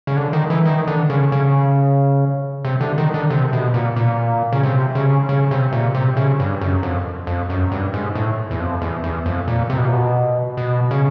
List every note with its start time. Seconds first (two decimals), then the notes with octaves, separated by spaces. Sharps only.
0.07 C#3
0.17 D3
0.33 D#3
0.50 E3
0.66 D#3
0.87 D3
1.10 C#3
1.32 C#3
2.65 C3
2.81 D3
2.98 D#3
3.14 D3
3.30 C3
3.53 B2
3.74 A#2
3.96 A#2
4.53 C#3
4.63 C3
4.95 C#3
5.29 C#3
5.51 C3
5.73 A#2
5.95 C3
6.17 C#3
6.40 G2
6.61 F#2
6.83 F2
7.27 F2
7.50 F#2
7.72 G2
7.94 G#2
8.15 A2
8.51 E2
8.60 F2
8.82 E2
9.04 E2
9.26 F2
9.48 A#2
9.70 C3
9.78 B2
9.85 A#2
9.93 B2
10.57 B2
10.91 C#3